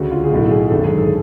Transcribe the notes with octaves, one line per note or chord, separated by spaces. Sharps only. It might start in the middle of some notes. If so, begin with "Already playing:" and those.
Already playing: D2 C#3 F#4
F4
G#4
B1 A2 F#4
G#4
G#1 F#2 D3 A4
G#4
A4